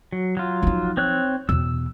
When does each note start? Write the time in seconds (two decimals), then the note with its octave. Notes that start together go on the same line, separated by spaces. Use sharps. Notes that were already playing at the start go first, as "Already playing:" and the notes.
0.12 F#3
0.37 F#3 F4
0.62 F3 D#4
0.97 C4 C#5 F#6
1.49 E2 B2 E6